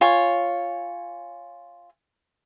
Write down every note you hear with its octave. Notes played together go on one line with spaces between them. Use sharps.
F4 C#5 G#5